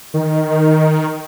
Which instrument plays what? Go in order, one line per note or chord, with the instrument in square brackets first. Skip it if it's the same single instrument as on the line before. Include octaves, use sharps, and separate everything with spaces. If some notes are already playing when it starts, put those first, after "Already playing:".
[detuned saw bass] D#3